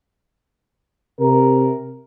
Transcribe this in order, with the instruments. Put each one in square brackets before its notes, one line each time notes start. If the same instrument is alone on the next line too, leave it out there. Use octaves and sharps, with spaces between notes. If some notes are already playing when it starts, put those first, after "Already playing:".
[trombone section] C3 A#4